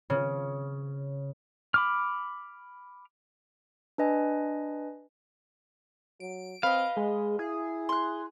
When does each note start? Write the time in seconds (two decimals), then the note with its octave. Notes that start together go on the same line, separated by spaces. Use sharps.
0.10 C#3
1.74 B5 D6 F6
3.98 D4 B4 D#5 G#5
6.20 F#3 D7
6.63 C4 B4 D#5 F5
6.97 G#3 G#4
7.39 E4 G#4
7.89 C6 F#6